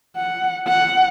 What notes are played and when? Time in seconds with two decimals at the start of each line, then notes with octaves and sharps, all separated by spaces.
0.17 F#5
0.68 F#5